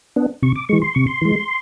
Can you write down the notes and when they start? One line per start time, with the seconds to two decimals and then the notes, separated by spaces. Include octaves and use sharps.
0.16 B3 D4
0.43 C3 C#6
0.56 D6
0.69 E3 G#3 C#6
0.82 C6
0.94 C3 C#6
1.07 C6
1.21 E3 G#3